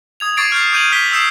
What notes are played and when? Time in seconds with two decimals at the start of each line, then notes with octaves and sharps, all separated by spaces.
0.20 D#6 G#6 F7
0.37 C#6 D6 G#6 A6 C7 D7
0.52 F6 G6 C7
0.73 D6 G6 D#7 F7 F#7
0.92 F6 B6 G7
1.11 D#6 E6 G6 C7 E7